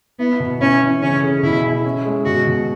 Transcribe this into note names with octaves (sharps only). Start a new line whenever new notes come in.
B3 E4
B2
C#4 E4
E3
C#3 C#4
G#4
B2 E4
E4
C#4
G#3
B2 F#4
B2